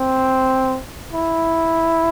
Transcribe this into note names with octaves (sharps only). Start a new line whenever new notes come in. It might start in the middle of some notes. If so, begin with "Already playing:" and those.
Already playing: C4
E4